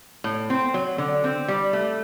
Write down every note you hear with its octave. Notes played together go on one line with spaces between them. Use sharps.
A2
C4
F#3
D3
C4
G3
A3